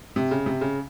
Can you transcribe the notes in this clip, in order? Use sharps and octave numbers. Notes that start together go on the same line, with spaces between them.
C3
C#3
C3
C#3